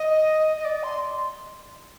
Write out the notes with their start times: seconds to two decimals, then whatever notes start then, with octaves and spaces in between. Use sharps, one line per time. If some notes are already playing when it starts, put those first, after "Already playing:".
Already playing: D#5
0.57 D#5
0.65 D5
0.83 C6